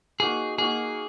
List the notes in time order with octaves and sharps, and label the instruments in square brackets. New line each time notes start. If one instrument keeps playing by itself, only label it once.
[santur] A#3 D#4 F#4 [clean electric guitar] G#4
[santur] A#3 D#4 F#4 [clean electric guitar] G#4